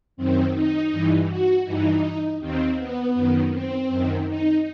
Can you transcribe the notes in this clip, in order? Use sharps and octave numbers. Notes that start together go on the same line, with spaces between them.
F#2 D#3 C4
D#4
G2 E3
F#4
G2 E3 D#4
D#2 D#3 C4
B3
F#2 D#3
C4
F#2 D#3
D#4